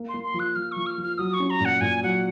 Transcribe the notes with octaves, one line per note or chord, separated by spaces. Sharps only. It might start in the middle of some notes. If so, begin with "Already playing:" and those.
Already playing: A#3
C6
A#3
C6
F3
F#6
F3 F6
F3 C#6
F6
F3
F6
F#3 D#6
C#6
C#4
A#5
A#2 F#5
A#2 G#5
F#3 F#5